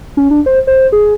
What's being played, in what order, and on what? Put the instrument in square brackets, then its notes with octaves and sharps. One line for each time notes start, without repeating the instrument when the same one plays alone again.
[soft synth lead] C#4
D4
C5
C5
G#4